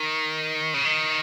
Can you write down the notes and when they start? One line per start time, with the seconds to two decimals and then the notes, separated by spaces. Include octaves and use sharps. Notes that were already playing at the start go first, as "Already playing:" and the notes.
Already playing: D#3
0.74 C#3
0.85 D#3